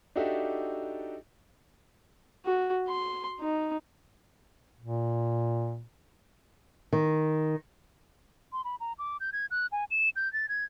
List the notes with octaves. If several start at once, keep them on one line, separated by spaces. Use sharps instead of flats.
D4 D#4 F#4 G4 A4 E5
F#4
C6
D#4
A#2
D#3
C6
B5
A#5
D6
G6
G#6
F#6
G#5
E7
G6
A6
G#6